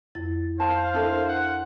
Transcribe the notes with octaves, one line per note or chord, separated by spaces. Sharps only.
F2 E4 A6
C5 F5 A5
D4 E4 A4 A#4
F#5